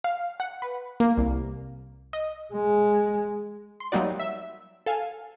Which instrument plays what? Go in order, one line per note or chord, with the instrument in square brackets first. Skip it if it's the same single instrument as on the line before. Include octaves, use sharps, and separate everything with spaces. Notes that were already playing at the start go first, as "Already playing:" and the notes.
[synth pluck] F5
F#5
B4
A#3
C2
D#5
[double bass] G#3
[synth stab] C6
F#3 G3 A#3 D#4 F#4 D5
E5
A4 F5 G#5